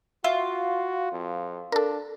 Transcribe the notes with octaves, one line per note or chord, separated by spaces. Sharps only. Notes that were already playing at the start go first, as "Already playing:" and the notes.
F4 F#4 E5
F2
D4 A4 A#4